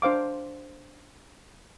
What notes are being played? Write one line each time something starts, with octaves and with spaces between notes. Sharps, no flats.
D4 C5 F5 D6